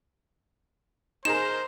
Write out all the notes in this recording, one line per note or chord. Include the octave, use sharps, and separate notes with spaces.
D#4 G#4 A#4 C5 E7